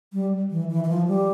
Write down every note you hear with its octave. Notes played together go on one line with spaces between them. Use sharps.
G3
E3
E3
E3
F3
G3